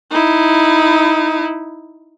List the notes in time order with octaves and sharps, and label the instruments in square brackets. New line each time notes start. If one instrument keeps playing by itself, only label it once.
[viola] D#4 E4